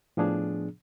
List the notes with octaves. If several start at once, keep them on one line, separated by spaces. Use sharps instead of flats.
A2 F3 B3 D4 G#4